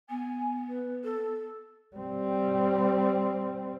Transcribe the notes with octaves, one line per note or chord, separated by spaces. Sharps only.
B3 G#5
B4
A4
G3 C4